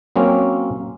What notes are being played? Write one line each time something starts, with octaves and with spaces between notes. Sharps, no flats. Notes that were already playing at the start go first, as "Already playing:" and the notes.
F#3 A#3 C4 C#4